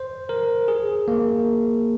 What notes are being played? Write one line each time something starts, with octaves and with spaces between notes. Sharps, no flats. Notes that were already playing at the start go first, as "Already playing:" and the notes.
Already playing: C5
A#4
G#4
A#3